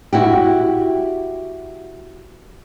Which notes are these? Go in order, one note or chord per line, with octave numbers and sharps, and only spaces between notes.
E4 F#4 G4